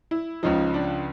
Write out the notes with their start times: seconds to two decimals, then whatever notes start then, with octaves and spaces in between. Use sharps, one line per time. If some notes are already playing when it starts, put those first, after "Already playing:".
0.11 E4
0.43 C#2 C#3 F3 D#4
0.74 D4